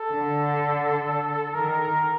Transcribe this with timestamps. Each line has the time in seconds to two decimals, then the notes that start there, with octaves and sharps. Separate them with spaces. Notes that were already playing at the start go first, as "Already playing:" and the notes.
Already playing: A4
0.10 D3
1.54 D#3 A#4